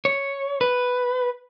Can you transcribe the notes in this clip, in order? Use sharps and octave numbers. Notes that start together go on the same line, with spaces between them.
C#5
B4